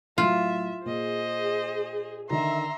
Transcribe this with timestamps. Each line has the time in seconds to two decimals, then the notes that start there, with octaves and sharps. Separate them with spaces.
0.18 A2 F#3 F4 E5
0.85 A#2 G#4 C5 D#5
2.30 D3 D#3 E5 A#5 C6